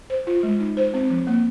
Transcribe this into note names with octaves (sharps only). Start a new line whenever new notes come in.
C5
F4
G#3
D#4
C5
C4
F3
A#3